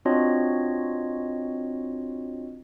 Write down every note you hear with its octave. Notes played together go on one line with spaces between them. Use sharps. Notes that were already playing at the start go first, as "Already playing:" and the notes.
C4 D4 F4 F#4 C#5 D#5